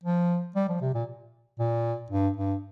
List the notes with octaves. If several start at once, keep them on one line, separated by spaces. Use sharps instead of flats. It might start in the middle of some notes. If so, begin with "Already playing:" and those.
F3
G3
F3
C3
A#2
A#2
G2
G2